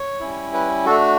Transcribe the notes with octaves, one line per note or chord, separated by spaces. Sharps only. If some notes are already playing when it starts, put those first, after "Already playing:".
Already playing: C#5
G3 C#4 E4
B4
A3 D4 F#4 A4